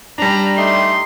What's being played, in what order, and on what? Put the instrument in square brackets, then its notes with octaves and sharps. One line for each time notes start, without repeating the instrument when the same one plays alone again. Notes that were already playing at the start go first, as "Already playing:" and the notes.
[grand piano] G3 D4 [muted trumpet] A#5
[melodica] A3 D#4 G4 [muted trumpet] C6